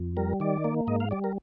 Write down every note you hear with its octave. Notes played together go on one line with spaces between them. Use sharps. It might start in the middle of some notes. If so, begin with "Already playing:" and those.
Already playing: F2
G3 A#4
D#3 D5
A#3
G#2 D#5
F5
G3 D5
A#4